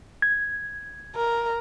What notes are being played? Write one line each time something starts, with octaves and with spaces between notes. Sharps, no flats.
G#6
A#4